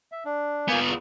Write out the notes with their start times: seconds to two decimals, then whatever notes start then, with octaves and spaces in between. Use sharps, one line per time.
0.12 E5
0.25 D4
0.68 A#3 B3 F4 G#5 G6
0.87 E2